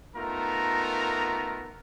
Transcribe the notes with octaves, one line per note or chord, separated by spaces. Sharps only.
A3 B3 D#4 F4 A#4 A#5